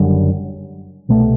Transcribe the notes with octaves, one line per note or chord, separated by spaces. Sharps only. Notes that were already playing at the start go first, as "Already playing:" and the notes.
Already playing: F#1 F#2 D3 G3
C2 B2 A3